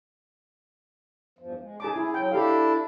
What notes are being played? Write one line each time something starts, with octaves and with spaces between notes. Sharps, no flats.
E2 G2 F3
G#3
D#4 G#4 A5 D6
E4 G#4
F#3 G5
D4 E4 G4 A4 F5